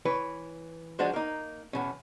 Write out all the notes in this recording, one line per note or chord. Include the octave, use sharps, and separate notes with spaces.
E3 B4 C#5
F3 G#3 D4 F#4 C5
A#3 D#4
E2 B2 C#4